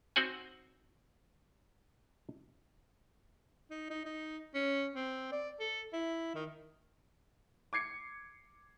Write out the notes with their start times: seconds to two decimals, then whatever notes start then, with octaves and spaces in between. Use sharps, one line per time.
0.16 C4 D#4 F#4 C5 F#5 G#5
3.71 D#4
3.90 D#4
4.06 D#4
4.55 C#4
4.96 C4
5.32 D5
5.60 A4
5.93 E4
6.35 D#3
7.73 D6 G#6 C7 C#7